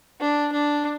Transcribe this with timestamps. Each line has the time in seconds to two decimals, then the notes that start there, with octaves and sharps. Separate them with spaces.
0.21 D4
0.53 D4